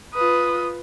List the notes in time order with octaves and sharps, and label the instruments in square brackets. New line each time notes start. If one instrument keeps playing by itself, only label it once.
[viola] F4 B4 [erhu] D#6